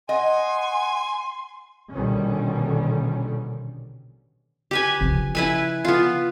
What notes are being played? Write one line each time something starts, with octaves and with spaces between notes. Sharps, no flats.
D#5 F#5 G#5 C6
A#1 B2 D3 D#3 G3 C#4
G4 B4 G#5
C#3 F3
E4 B4 G#5
B3 F4